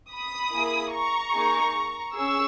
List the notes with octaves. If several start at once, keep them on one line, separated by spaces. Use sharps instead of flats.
B5 D#6
A#3 E4 G#4
A#5 C#6
A#3 D#4 G#4
C#4 G#4 C#6 E6